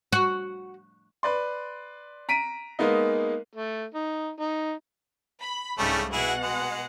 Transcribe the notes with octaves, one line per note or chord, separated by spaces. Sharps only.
F#4
B4 D5 C6
A#5 B6 D7 D#7
G#3 A#3 B3 D#4
A3
D#4
D#4
B5
C2 G#2 C#3 G3 A3 C#4
B2 E4 G#4 F#5
G#3